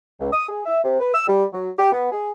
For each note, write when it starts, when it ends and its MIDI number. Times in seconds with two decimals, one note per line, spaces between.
0.20 0.30 37
0.32 0.49 87
0.49 0.61 68
0.66 0.79 76
0.83 0.97 48
1.00 1.11 71
1.14 1.25 88
1.27 1.43 55
1.52 1.70 54
1.78 1.91 67
1.92 2.12 59
2.12 2.29 68